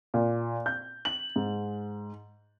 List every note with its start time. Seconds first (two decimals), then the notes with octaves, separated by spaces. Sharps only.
0.14 A#2
0.66 G6
1.05 F#7
1.36 G#2